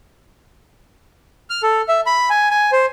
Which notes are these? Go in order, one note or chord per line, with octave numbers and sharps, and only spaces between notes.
F6
A4
E5
B5
G#5
G#5
C5